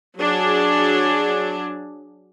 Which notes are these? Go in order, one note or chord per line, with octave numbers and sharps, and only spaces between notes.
F#3 D4 G#4